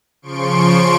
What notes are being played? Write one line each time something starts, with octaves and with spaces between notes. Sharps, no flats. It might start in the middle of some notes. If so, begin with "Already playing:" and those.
C#3 F3 C6 C#6 D7